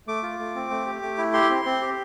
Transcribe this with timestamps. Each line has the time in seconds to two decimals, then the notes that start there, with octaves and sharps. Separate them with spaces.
0.07 A3 D6
0.23 F4
0.39 A3
0.56 C4
0.70 A3
0.86 G4
1.03 A3
1.18 E4
1.33 G4 C6
1.50 C4
1.65 C4
1.81 G4